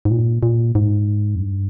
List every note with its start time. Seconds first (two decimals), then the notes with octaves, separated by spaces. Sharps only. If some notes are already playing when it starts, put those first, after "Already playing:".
0.05 G#2
0.11 A#2
0.43 A#2
0.75 G#2
1.35 F2
1.40 G2